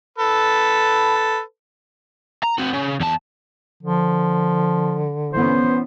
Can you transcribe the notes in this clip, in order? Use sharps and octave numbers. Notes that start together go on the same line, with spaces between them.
A4 B4
A#5
C4 F#4
C#3
E2 A5
D3 F3
E3 B3 C#4 C5